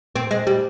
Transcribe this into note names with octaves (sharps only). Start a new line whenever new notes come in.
C4
G#3
G3